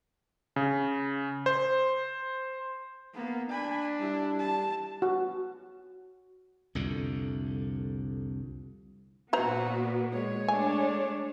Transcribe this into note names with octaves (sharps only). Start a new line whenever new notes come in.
C#3
C5
A#3 B3
D4 G#5 B5
G3 E4
A5
F#4
C2 F2 D3
A#2 B3 F#4 B4 C5 A#5
G#3 C#5
A3 D4 G#5